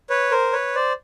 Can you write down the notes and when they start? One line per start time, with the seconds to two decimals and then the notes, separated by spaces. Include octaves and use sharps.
0.10 B4 C#5
0.31 A#4 C5
0.53 B4 C#5
0.75 C5 D5